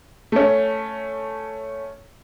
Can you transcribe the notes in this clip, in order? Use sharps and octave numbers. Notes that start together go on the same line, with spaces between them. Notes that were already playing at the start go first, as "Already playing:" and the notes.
A3 C#4